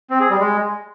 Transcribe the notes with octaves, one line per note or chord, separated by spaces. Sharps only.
C4
G#4
G3
G#3